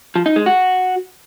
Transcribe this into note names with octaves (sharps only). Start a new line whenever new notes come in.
F3
D#4
G#3
F#4